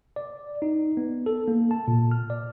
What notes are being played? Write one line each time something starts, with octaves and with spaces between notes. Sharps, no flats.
D5
D#4
B3
A4
A#3
A5
A#2
F6
D5